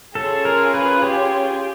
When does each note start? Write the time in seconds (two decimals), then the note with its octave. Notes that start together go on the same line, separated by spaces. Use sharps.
0.15 C#4 F4 G#4 A4
0.45 A#4
0.74 B4
1.02 G4